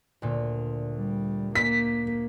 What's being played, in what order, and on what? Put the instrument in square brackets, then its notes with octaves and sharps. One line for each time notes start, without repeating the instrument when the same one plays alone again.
[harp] D2 A#2
[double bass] G3
[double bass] A#3 [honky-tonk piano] B6